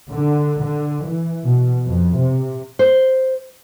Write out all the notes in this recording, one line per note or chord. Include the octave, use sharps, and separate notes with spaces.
D3
D3
E3
B2
F2
C3
C5